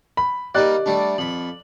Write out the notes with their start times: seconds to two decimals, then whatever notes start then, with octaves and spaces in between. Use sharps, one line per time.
0.17 B5
0.55 G3 A#3 D#4 G4 D5 D#5 F#6
0.86 G3 A3 D4
1.18 F2 B5 F#7